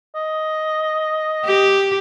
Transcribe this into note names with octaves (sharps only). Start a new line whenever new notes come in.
D#5
G4